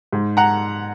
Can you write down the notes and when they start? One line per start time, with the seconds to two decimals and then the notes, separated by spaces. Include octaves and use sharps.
0.13 G#2
0.37 F#5 A#5